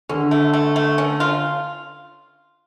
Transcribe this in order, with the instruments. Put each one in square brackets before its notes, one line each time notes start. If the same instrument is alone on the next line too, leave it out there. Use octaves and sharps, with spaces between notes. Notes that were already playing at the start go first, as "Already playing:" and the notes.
[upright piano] D3 [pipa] C#4
[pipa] A3
A3
A3
C#4
F4